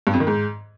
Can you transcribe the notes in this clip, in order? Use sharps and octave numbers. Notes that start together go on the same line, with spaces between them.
G2
F2
D#3
G#2